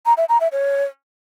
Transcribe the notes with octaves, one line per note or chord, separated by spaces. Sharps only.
A#5
E5
A#5
E5
C#5